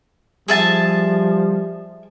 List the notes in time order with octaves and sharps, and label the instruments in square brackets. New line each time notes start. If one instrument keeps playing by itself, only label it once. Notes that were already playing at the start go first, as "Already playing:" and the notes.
[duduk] F3 [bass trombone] G3 [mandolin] G#4 E5 A5